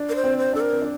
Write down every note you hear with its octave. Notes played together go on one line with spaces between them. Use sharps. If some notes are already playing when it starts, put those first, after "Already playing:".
Already playing: D4
A#4
C5
C4
C5
D4 A4
A#4
C4
D4